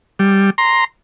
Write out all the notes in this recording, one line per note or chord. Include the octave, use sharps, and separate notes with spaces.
G3
A#5 C6